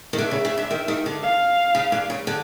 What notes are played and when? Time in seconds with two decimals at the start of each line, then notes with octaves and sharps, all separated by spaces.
0.13 D#3
0.18 D3 E5
0.31 C#3
0.45 C#3
0.58 D3
0.71 D#3
0.88 D#3
1.06 D3
1.23 F5
1.75 C#3
1.92 D3
2.10 C#3
2.27 D3